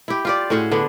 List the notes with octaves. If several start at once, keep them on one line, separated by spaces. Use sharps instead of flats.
E4 G4
F4 G4 D5
A2 C#4 F#4 G#4
D3 B3 D4